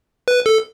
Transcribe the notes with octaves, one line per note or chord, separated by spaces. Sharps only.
B4
A4